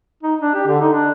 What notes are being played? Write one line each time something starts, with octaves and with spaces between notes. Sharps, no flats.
D#4
D4
G4
D3
D#4
D4